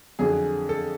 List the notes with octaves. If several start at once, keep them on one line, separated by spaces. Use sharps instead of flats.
F2 D3 F#3 G#4
A4